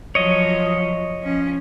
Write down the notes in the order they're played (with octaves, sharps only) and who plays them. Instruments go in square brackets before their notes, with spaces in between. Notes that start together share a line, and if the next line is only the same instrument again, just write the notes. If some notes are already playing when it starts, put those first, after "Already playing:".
[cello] F3 F#3 [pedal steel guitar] C#5 D#5
[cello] F3 C#4